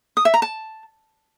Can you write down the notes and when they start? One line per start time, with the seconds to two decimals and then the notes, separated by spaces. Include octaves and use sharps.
0.17 D#6
0.25 E5
0.34 A#5
0.42 A5